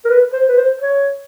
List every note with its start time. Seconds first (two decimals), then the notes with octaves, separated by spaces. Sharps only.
0.04 A#4
0.09 B4
0.33 C5
0.49 B4
0.57 C5
0.80 C#5